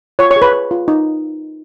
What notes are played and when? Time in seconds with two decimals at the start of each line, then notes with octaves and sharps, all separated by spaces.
0.19 F4 C#5 C#6
0.31 C#5 C#6
0.36 G#4
0.42 B4 B5
0.53 B4
0.71 F4
0.88 D#4